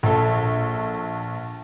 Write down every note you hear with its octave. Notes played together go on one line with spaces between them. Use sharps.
A#1 A4